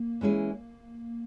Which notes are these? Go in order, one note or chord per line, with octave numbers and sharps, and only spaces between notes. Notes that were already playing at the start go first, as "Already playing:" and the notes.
Already playing: A#3
E3 G#3 C#4 E4 G#4